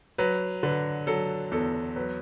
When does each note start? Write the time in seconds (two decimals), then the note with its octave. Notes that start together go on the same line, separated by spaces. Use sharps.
0.18 F#3 B4
0.63 D3 B4
1.07 F#3 A4
1.51 E2 A4
1.96 F#3 B4